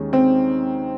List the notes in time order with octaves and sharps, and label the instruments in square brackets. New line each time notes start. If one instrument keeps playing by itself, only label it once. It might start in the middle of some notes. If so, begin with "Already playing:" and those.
Already playing: [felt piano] D#2 D#3 G#3 C#4
[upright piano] C4